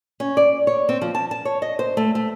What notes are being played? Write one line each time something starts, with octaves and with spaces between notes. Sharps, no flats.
C#4
D5
C#5
C4
F3
A5
A5
C#5
D#5
C5
A3
A3